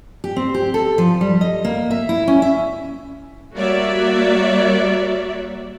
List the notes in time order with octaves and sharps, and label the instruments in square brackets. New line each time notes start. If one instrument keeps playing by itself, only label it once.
[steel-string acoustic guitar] G4
C4
G4
A4
F3
G3
D#5
A#3
E5
E4
C#4
E5
[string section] G3 A#3 F#4 C#5 D5 E5